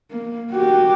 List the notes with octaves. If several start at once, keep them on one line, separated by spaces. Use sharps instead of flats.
A#3
F#4 G4